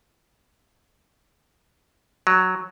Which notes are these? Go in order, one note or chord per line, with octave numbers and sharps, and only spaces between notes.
F#3